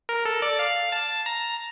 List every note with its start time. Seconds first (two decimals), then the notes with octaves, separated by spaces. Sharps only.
0.09 A#4
0.25 A4
0.42 D5
0.59 F5
0.92 A5
1.26 A#5